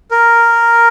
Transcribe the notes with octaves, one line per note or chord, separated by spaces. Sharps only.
A#4